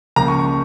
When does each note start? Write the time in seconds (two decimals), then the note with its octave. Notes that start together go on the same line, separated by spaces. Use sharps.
0.16 C#2 C#3 F3 A#3 A#5
0.28 C#6
0.39 C#6